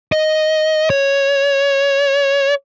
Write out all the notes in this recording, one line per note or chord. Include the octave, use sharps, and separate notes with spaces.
D#5
C#5